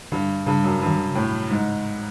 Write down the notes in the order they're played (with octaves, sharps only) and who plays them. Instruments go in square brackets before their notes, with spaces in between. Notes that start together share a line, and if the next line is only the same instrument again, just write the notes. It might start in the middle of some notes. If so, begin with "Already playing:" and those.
[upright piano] G2 [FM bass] D3
[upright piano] G2 [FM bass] C#3
[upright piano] F#2
G2
[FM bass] D#3
D3
C#3
[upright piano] A2 [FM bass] C3
[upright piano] G#2 [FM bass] C#3